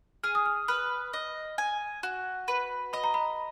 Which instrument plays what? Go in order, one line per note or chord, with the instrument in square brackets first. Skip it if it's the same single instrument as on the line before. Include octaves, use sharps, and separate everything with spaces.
[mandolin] G#4 [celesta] F6
[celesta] D#6
F6
[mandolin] B4 [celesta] F6
[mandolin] D#5
G#5
F#4
B4
[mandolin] D#5 [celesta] B5
[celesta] A#5
B5